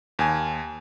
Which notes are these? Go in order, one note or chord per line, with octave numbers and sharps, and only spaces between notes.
D#2 G#5